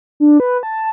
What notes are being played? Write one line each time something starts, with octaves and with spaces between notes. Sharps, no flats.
D4
B4
A5